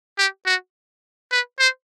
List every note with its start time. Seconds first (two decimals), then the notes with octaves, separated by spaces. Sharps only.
0.18 G4
0.46 F#4
1.31 B4
1.59 C5